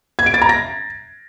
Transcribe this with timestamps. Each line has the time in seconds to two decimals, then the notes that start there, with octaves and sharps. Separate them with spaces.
0.19 G#6
0.26 D7
0.34 A6
0.42 A#5
0.49 A#6